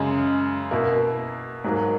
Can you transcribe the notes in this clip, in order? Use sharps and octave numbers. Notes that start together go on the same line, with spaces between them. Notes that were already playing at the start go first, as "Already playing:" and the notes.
Already playing: F#2 C#3 G#3
B2 A#3 E4
G#2 F#3 A#3